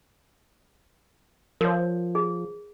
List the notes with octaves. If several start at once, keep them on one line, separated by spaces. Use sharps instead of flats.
F3 A#4 C#5
G#4